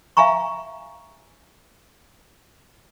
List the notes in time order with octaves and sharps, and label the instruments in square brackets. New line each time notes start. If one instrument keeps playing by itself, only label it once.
[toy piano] E5 F5 G#5 A#5 C#6